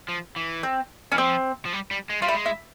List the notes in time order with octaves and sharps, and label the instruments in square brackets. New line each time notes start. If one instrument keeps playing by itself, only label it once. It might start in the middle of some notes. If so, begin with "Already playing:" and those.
[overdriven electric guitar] F3
E3
[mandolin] C4
[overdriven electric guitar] E3 [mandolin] C#4
[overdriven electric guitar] F3 [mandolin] C4
[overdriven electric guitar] F3
G3
G3
G#3
[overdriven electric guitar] G3 [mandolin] F4
[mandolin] E4
[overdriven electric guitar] G#3
[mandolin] E4